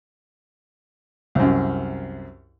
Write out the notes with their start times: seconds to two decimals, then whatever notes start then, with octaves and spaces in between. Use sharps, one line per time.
1.35 C2 F#2